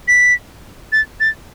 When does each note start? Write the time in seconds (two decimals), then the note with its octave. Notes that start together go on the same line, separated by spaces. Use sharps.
0.08 B6
0.92 A6
1.20 A6